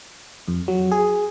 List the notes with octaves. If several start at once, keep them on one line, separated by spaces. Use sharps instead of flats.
F2
F#3
G#4